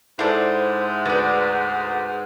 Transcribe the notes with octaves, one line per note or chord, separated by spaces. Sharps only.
G#2 E4 A4 C5 D5 F#5
D2 B3 D5